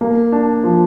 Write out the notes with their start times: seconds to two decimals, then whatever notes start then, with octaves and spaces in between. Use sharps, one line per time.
0.01 A#3
0.32 D4
0.64 F3